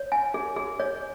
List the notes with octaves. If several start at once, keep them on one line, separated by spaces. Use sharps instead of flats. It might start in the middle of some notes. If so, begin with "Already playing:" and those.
Already playing: C#5
G#5
G#4
G#4
C#5